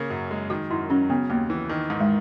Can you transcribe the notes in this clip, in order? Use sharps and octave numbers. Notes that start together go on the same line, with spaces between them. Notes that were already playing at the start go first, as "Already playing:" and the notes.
Already playing: C#3 A#3
F#2
G#3
D#3 F#4
F#2 E4
F#3 C#4
C#3 B3
D#2 A#3
E3
D#3
G#2
G#3